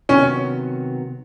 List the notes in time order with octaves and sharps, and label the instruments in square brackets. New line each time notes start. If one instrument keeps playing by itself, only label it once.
[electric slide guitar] C3 D#3 F#3 B3 [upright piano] C#4